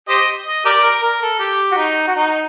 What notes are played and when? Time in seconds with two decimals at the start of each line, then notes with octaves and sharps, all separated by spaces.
0.09 G4 C5 D#5
0.46 D#5
0.65 G4 A#4 D5
0.83 A#4
1.03 A#4
1.22 A4
1.40 G4
1.72 F#4
1.77 D#4
2.07 F#4
2.16 D#4